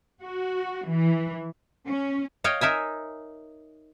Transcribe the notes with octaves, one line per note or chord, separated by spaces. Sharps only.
F#4
E3
C#4
C#5 D#5 F5 G5
D#4 A#4 E5 G#5